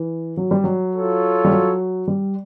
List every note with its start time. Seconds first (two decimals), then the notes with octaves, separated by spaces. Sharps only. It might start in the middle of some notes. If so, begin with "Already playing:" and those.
Already playing: E3
0.37 F#3
0.51 G3
0.64 F#3
0.94 F4 A4 C#5
1.45 G3
1.51 F#3
2.08 G3